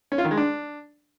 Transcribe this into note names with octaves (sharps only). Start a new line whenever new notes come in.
C#4
F4
D#3
G#3
D4